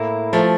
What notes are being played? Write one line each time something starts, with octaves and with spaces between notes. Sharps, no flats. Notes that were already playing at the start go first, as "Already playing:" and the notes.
Already playing: A2 A#3 E4
F3 A3